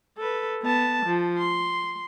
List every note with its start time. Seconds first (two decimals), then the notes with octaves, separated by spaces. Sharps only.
0.18 A4 B4
0.63 B3 A5
1.06 F3
1.38 C6